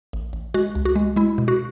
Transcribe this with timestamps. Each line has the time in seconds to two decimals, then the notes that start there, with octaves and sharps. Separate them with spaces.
0.13 A1
0.33 A1
0.54 G#3 F#4
0.75 C#2
0.85 F#4
0.96 G#3
1.16 G#3 E4
1.38 B2
1.48 F#4